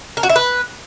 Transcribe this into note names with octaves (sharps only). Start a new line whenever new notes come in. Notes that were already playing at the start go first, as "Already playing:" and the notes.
A#4
F#4
E4
B4